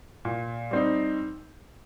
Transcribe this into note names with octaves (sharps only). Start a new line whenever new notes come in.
A#2
G3 C4 D#4